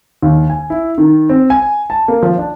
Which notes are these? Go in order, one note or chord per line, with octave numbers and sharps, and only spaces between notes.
D#2
G#5
E4
D#3
C4
G#5
A5
A#3
F3
D4